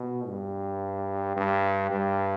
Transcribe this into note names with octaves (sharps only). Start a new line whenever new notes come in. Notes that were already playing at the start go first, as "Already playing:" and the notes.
Already playing: B2
G2
G2
G2